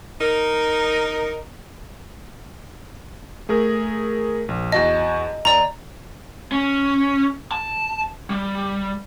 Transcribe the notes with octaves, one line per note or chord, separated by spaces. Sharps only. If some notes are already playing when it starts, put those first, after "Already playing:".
D#4 A#4
A3 G#4 A#4
A#1
E2 F#4 D#5 A5
D#2 D5 A#5
C#4
A5
G3